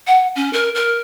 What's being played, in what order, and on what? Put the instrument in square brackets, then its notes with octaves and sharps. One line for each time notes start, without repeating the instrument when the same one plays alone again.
[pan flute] F#5
C#4
A#4
A#4